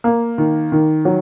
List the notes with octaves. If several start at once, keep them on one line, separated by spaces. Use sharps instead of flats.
A#3
D#3
D#3
F#3